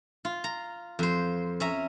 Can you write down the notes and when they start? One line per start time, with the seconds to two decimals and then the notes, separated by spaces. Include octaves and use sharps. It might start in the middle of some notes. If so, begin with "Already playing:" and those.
0.25 F4
0.44 A#5
0.99 F2 C5
1.60 C#4 E5 A#5